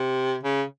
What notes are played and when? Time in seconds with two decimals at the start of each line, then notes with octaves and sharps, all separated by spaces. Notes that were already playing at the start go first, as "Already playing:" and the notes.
Already playing: C3
0.43 C#3